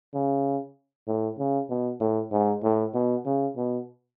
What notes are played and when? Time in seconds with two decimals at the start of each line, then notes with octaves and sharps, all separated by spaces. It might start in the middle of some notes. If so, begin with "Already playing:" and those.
0.14 C#3
1.07 A2
1.38 C#3
1.70 B2
2.00 A2
2.32 G#2
2.63 A2
2.94 B2
3.26 C#3
3.57 B2